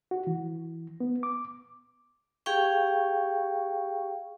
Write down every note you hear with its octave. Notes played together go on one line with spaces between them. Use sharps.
F#4
E3
B3
D6
G4 G#4 F5 G5 C#6